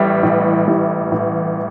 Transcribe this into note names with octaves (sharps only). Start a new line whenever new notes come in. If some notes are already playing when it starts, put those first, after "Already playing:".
Already playing: A1 A2 E3 G3
A1
A2 E3 G3
A1